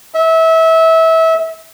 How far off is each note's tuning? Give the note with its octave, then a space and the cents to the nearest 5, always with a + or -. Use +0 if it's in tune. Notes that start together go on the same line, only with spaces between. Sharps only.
E5 -25